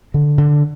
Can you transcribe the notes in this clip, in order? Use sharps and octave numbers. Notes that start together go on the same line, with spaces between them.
D3
D3